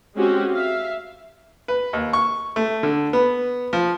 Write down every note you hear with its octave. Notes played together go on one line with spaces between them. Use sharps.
G#3 C4 C#4 F#4 G4
E5 F5
B4
D#2
C#6
A3
D3
B3
F3